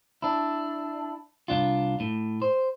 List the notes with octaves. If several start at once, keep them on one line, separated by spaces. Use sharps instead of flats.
D4 E4
C2 G#2 D4 F4
A2
C5